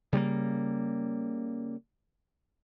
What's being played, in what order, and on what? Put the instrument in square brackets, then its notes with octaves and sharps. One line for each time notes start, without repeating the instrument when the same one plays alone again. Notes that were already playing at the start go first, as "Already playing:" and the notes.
[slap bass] C#3 G3 A3 A#3